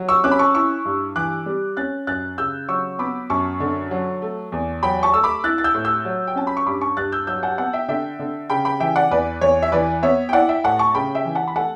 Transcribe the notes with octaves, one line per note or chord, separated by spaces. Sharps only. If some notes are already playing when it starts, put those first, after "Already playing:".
Already playing: F#3
C#6 E6
C#4 D6 F#6
B5
A5 C#6
E4 C#6 E6
G2
E3 D6 F#6
G3
C#4 F#6 A6
F#2 F#6 A6
C#3 E6 G6
F#3 C#6 E6
B3 B5 D6
F#2 A5 C#6
D3
F#3
A3
E2
F#3 G5 B5
A5 C#6
A3 E6
B5 D6
E4 F#6 A6
A6
E6 G6
A2
E6 G6
F#3
G5
C#4 A5
B5
C#6
G2 B5 D6
A5 C#6
G2 F#6 A6
E6 G6
F#3 E6 G6
F#5 A5
B3 F#5 A5
E5 G5
D3 E5 G5
D3
C#3 G5 B5
G5 B5
E3 E5 G5
D5 F#5
E2 B4 D5
E2 C#5
E5
E3 B4 D5
B3 C#5 E5
G5
E4 D5 F#5
E5 G5
A2 F#5 A5
A5 C#6
C#3 G5 B5
E5 G5
E3
F#5 A5
B5
A3 F#5 A5